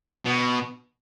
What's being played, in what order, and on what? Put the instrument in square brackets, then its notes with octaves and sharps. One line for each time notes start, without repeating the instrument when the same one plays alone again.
[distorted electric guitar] B2